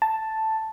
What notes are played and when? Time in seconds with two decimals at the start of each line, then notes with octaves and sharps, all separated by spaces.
0.02 A5